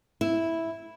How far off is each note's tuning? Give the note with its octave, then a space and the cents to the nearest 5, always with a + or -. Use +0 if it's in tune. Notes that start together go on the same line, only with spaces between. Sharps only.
E4 -5